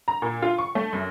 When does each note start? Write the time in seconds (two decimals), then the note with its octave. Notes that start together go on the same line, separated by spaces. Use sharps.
0.08 A#5
0.22 A#2
0.42 F4
0.58 C#6
0.75 A3
0.93 F#2